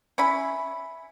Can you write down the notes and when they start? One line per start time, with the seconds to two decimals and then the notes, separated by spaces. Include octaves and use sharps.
0.18 C#4 E4 B5